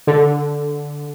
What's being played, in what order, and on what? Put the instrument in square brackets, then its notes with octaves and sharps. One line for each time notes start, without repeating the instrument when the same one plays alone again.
[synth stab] D3